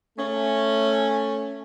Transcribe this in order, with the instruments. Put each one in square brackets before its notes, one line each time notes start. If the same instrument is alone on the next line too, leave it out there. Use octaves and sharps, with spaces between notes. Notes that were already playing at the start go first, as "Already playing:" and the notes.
[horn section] A3 C#4